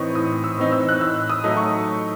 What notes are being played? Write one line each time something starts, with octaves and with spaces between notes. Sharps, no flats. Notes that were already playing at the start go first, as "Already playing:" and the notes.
Already playing: A2 E3 C4 D#4 C#6 D#6
A2 D#6
E6
E3 C4 D#4
E6
F#6
A2 E6
D#6
F#3 A3 D#4
C#6